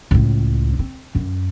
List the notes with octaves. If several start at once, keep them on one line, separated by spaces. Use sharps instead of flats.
C#2 A2
C4
F#2